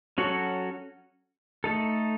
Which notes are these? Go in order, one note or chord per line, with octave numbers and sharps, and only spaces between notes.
F#3 C#4 F#4 A4 C#5
A3 D#4 A4